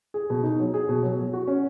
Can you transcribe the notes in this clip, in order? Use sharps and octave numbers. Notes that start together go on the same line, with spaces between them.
G#4
B2
D#4
F#3
G#4
B2
F#3
F#3
F#4
C#4